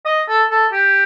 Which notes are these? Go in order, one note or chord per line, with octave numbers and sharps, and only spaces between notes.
D#5
A4
A4
G4